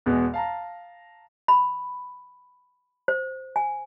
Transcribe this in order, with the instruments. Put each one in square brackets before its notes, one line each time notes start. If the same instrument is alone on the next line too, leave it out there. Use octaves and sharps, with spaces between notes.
[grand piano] E2 B2 G#3 B3
F5 A5 A#5
[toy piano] B5
C5
G#5